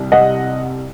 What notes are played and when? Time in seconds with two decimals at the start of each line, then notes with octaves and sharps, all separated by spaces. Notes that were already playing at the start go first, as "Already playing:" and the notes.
Already playing: C2 C3
0.12 D#5 F#5